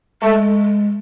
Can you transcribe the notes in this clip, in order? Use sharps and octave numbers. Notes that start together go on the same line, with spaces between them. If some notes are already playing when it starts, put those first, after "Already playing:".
G#3 A3